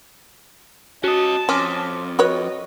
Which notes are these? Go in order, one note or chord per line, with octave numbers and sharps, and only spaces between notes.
C#4 F#4 D#5 A5
F2 C#4 C6 D6 F6
F#4 B4 C#5 D#5